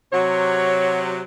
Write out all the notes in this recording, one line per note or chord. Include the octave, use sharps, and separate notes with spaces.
C3 F#3 C#5